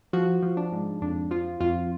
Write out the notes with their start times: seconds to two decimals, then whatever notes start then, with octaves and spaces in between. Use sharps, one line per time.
0.13 F3 F#4
0.43 F3
0.57 D4
0.72 G#2
1.02 F2 D4
1.31 F3 F4
1.60 F2 F4